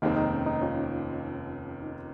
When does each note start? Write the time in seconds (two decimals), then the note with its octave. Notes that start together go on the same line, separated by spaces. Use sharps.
0.02 F1 D#2 D#3 G#3 C4 D#4
0.16 D#4
0.32 C#4
0.46 D#4
0.62 C#4 F4
1.82 D#4